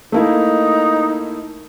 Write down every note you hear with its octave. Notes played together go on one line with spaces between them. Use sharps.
A3 A#3 D#4 E4